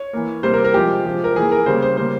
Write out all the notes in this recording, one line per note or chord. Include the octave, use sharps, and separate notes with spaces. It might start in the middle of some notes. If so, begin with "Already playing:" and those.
Already playing: C#5
E3 A#3
C3 G3 A#3 C5
A#4
A#4
C3 F3 G#3 G4
C3 F3 G#3
A#4
E3 A#3 G#4
A#4
C#3 G3 A#3 C5
C5
C#3 G3 A#3 C5